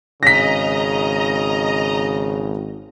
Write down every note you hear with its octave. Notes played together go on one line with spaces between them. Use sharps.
G#1 C#3 D#5 A#5 A#6 B6